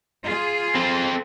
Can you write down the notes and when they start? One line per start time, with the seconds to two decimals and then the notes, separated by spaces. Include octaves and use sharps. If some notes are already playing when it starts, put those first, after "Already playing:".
0.24 F4 G#4
0.75 C4 A4